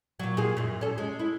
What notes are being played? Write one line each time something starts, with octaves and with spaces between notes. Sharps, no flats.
A#2 F#3
A#2 G#4
F#2 A#2
C#4 A4
G#3
E4